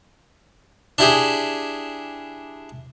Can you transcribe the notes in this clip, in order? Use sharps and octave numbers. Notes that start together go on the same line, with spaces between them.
D4 E4 G4 G#4